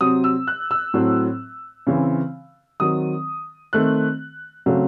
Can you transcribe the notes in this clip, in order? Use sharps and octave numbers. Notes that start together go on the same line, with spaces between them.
C3 F#3 C4 D#6
E6
F#6
E6
A2 F#3 C4
C#3 E3 C4
D#3 F#3 C4 D#6
D#3 A3 C4 F#6
C#3 F#3 A3 C4